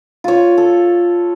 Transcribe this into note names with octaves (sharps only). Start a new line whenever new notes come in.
F4 C#5
A4